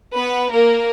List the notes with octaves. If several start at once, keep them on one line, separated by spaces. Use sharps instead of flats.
B3 B4
A#3 A#4